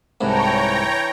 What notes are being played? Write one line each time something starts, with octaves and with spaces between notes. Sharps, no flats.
C2 G#2 E3 D4 C#5 G5 A#5